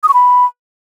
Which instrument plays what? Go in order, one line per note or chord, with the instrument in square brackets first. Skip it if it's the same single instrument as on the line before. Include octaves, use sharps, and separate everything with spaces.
[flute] D#6
C#6
B5